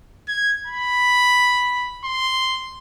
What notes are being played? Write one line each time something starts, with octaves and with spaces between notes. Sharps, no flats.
G#6
B5
C6